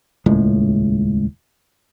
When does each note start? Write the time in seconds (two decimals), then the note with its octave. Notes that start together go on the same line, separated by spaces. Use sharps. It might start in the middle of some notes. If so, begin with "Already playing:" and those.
0.26 D#1 C#2 A2 G#3